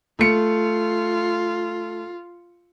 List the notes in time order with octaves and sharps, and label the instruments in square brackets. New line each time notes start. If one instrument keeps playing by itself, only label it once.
[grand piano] A3 C#7 [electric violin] F4